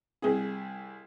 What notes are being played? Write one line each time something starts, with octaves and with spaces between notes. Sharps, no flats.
C2 G#4